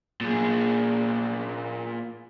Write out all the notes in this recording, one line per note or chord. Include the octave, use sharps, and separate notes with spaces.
A#2 G#4